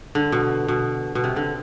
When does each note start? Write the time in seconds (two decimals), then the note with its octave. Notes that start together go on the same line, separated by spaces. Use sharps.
0.15 D3
0.32 B2
0.68 B2
1.15 B2
1.24 C3
1.36 D3